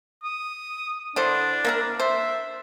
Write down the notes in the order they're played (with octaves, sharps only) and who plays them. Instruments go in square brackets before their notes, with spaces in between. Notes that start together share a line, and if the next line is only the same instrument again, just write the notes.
[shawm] D#6
[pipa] D3 E4 C5 [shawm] D4
[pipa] A#3 E4 A#4
[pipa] C5 [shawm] E5